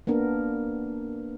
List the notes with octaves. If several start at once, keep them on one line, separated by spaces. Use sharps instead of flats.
A#3 B3 D4 A#4